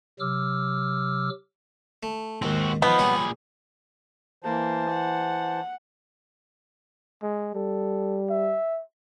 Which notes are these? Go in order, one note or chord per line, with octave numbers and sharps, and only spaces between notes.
C3 F#3 D6 E6 F6
A3
D#2 G#2 C4 F#4
E3 F3 B3 D#4 B5
A#2 G3 G#4 C#5 G5
E3 A#3 C5 A5
F#5
G#3
G3 A4
E5